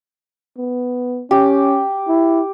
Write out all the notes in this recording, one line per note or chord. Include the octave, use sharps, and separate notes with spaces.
B3
C#4 G4
E4